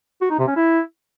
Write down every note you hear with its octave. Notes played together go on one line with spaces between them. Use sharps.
F#4
D#4
C3
C#4
E4